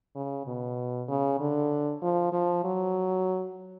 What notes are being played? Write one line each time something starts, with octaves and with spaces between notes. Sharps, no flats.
C#3
B2
C#3
D3
F3
F3
F#3